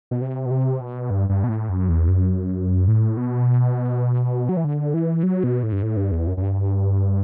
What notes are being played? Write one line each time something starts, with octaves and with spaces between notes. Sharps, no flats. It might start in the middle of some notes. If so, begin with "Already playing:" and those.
B2
C3
B2
C3
B2
G2
G2
B2
A2
F#2
E2
F#2
A2
B2
F#3
E3
D3
E3
F#3
B2
A2
G2
A2
G2
E2
F#2
F#2
G2